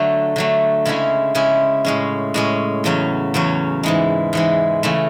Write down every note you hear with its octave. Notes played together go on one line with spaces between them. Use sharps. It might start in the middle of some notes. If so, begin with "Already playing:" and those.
Already playing: D3 F#3 A3
D3 F#3 A3
C#3 G#3 C#4 E4
C#3 G#3 C#4 E4
A2 G#3 C#4
A2 G#3 C#4
E2 C#3 F#3 C#4
E2 C#3 F#3 C#4
G#2 E3 G#3
G#2 E3 G#3
C#3 E3 A3